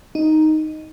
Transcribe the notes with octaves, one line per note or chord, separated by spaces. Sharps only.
D#4